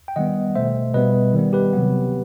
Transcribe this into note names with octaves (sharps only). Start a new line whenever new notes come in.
G5
D#3 G3 B3 D#5 F#5
B2 A3 C5 E5
B2 G3 B3 B4 D#5
D#3 G3 B3
G4 B4
C3 F#3 B3